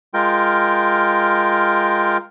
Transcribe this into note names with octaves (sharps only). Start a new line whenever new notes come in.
G#3 F4 A#4 G5